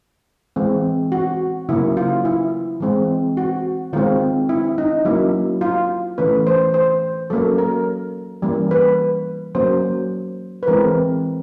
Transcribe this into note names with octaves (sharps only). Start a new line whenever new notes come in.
E3 G#3 C4
F#4
C#3 F#3 A#3 C#4 E4
F4
E4
E3 G#3 C4
F#4
D#3 G#3 C4 F4
E4
D#4
F#3 A#3 C#4 E4
F4
E3 A3 C#4 B4
C5
C5
F#3 A#3 C#4 A4
A#4
E3 G3 A#3 C#4
B4
F#3 A#3 C#4 C5
B4
E3 G#3 C4 A#4